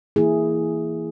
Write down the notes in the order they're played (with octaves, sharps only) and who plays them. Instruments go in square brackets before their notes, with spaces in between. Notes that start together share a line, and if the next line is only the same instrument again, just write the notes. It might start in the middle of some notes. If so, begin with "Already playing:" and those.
[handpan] E3 A#3 E4 G#4